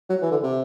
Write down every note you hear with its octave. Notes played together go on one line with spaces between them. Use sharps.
F#3
E3
D3
C3